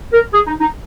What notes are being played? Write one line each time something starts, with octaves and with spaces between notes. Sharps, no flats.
A#4
G#4
D#4
D#4